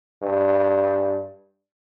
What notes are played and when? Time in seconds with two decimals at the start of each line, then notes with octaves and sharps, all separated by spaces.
0.22 G2